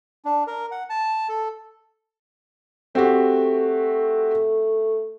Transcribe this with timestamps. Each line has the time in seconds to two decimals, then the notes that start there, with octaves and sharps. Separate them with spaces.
0.25 D4
0.47 A#4
0.71 F#5
0.90 A5
1.29 A4
2.95 A3 C4 F#4 G4